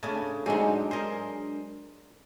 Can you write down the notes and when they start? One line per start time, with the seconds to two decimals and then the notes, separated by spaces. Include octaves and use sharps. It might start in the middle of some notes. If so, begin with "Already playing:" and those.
0.03 C#3 A3 D4 G#5 A5
0.46 D2 G#2 F#3 G#3 C4 D4 D#4 G#4
0.91 G#4 A#4 C5 D#5